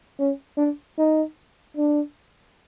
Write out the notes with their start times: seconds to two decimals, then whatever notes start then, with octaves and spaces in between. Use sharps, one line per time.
0.19 C#4
0.58 D4
0.98 D#4
1.77 D4